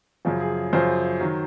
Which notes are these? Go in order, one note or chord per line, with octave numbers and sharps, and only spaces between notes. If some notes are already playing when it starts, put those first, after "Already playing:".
F#2 C#3 F3
G#4
F#2 C#3 F3 C5
D#3 F#3